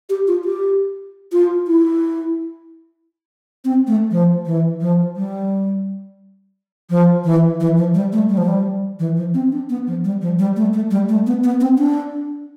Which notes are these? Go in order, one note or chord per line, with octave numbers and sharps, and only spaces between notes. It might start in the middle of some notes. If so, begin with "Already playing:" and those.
G4
F4
G4
F4
E4
C4
A3
F3
E3
F3
G3
F3
E3
E3
F3
G3
A3
G3
F3
G3
E3
F3
C4
D4
B3
F3
G3
F3
G3
A3
A3
G3
A3
B3
B3
C4
D4